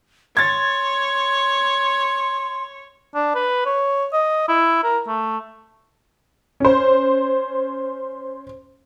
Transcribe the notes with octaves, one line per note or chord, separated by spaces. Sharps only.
C#5 C6 G#6 A6
D4
B4
C#5
D#5
E4
A#4
A3
C#4 C5